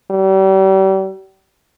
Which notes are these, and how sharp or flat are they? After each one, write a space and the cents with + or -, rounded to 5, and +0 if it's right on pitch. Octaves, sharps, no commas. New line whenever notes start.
G3 -40